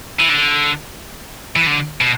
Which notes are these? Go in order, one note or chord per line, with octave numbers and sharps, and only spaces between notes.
E3
D3
E3
D3
B2